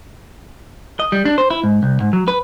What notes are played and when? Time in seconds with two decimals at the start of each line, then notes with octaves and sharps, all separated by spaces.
1.00 D#5
1.12 G3
1.25 D4
1.38 C5
1.50 E4
1.63 G#2
1.83 C2
2.00 G#2
2.13 F#3
2.28 B4